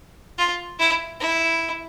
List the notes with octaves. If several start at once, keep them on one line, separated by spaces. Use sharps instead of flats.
F4
E4
E4